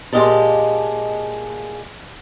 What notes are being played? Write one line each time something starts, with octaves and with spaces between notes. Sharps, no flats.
A#2 G#3 F#4 G4 D#5 A5